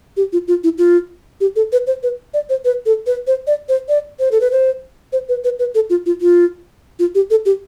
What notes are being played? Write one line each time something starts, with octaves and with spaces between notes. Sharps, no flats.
G4
F4
F4
E4
F4
G4
A4
B4
C5
B4
D5
C5
B4
A4
B4
C5
D5
C5
D5
C5
A4
B4
C5
C5
B4
B4
B4
A4
F4
F4
F4
F4
G4
A4
G4